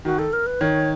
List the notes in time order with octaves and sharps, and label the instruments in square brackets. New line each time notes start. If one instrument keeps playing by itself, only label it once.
[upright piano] D#3 [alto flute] F#4
[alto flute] A4
A#4
B4
[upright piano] D#3 [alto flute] C#5